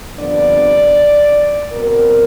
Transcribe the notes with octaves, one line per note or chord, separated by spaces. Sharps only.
F2 D3 G3 B3 D4 D5
B2 G3 C4 A#4